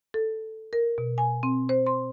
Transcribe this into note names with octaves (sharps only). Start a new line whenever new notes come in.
A4
A#4
B2
G#5
C4
C5
C6